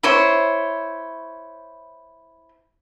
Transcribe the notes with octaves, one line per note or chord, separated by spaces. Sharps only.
E4 C5 C#5